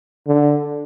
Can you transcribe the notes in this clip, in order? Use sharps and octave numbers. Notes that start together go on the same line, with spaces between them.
D3